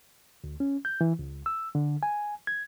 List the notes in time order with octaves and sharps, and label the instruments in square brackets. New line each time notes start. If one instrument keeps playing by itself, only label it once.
[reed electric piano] D2
C#4
G6
E3
C#2
E6
D3
G#5
G#6